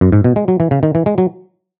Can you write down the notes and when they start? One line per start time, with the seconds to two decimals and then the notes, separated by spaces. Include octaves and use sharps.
0.01 F#2
0.12 G#2
0.24 B2
0.36 G#3
0.48 F#3
0.60 E3
0.71 C#3
0.83 D#3
0.95 E3
1.06 G#3
1.18 F#3